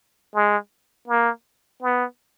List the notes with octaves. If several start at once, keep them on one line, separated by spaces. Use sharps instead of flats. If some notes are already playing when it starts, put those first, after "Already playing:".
G#3
A#3
B3